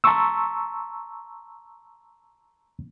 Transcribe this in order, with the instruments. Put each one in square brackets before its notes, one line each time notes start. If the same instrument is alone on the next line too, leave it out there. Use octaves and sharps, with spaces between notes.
[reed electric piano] A5 A#5 C6 C#6 E6